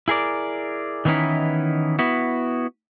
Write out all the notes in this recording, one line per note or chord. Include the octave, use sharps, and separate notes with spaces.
E4 G#4 A#4 D5
D#3 E3 B3 C#4 D#4 E4
B3 E4 F#4